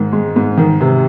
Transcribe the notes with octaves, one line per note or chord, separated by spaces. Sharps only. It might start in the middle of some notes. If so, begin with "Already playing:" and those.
Already playing: G#2 D#3
G#3
G#2
D#3
C3